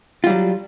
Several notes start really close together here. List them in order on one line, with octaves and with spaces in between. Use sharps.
F4 G3 F#3